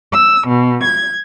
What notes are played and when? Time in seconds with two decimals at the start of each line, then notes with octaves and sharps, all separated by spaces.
0.12 E6
0.47 B2
0.84 G#6